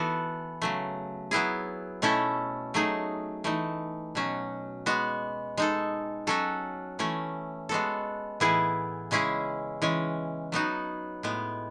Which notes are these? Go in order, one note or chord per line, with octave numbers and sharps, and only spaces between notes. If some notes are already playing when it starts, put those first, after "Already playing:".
Already playing: E3 B3 F#4 A4
C#3 F#3 A3
F#3 B3 E4 G#4
B2 A3 C#4 E4 A4
F#3 A3 D#4 G#4
E3 A3 D#4
B2 F#3 C#4
G#3 B3 F#4
G#3 D#4 A4
F#3 C#4 F#4 A4
E3 A3 C#4
G#3 B3 F#4 A4
A2 E3 B3 E4 G#4
C#3 G#3 C#4 E4 G#4
E3 G#3 C#4
F#3 B3 D#4 F#4
A2 G#3 B3